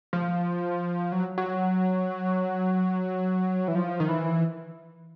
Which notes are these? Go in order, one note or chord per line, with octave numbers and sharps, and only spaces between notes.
F3
F#3
F#3
E3
F3
D#3
E3